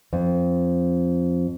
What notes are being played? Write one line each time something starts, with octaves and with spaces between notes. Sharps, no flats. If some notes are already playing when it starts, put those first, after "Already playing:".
F2